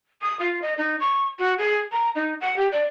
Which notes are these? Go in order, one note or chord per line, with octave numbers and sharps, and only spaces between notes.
D#6
F4
D#5
D#4
C#6
F#4
G#4
A#5
D#4
F#5
G4
D5